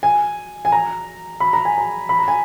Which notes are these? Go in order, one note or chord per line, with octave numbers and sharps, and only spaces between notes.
G#5
G#5
A#5
B5
A#5
G#5
A#5
B5
A#5
G#5